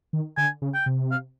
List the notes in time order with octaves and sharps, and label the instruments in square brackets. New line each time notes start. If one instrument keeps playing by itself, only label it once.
[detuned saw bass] D#3
[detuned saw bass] D3 [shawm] G#5
[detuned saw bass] C#3
[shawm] G5
[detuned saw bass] C3
[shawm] F5